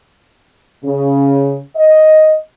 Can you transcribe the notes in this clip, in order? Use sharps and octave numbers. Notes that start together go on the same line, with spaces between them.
C#3
D#5